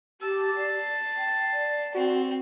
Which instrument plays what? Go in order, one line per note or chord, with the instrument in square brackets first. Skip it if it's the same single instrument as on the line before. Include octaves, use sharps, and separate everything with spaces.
[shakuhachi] G4 [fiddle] A5 [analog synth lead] E6
[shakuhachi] D5 [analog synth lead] C7
[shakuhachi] G5
D5
[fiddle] C4 [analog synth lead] F#4